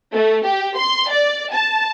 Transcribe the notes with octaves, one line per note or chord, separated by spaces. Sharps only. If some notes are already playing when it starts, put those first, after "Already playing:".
A3
G4
C6
D5
A5